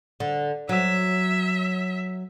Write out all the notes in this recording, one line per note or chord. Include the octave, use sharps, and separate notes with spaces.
D3
F#3 E5